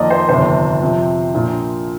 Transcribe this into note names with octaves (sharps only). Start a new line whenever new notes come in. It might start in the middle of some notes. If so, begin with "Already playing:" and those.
Already playing: F2 D#3 A#3 D5 D#5
C5
G1 F2 C3 D#3 C5
F2 C3 F3 C4
A#1 A#2 F3